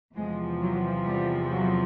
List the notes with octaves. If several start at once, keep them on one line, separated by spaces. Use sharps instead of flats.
E2 C3 F3 G#3
F#3
G3
F#3